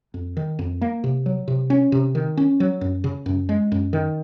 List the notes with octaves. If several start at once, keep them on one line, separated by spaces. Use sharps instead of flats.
F2
D#3
F2
A#3
C3
F#3
C3
C#4
C3
D#3
C#4
F#3
F#2
C#3
F#2
G#3
F#2
D#3